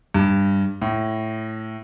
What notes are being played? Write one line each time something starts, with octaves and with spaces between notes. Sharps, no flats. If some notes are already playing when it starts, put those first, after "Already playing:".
G2
A2